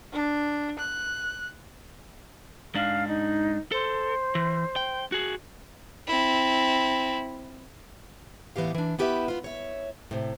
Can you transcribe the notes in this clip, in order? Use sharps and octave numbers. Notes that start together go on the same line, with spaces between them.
D4
F#6
G#2 D4 F5
D#4
A4 C5
E3
G5
F#4 G#4
C4 E4
A2 E3 B3 G4 F5
E3 D4
B3 E4 G4 B4 D5 E5
B3 F4
C#5 E5
A2 C3